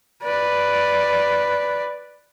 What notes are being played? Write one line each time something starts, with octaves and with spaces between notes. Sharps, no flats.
B4 D5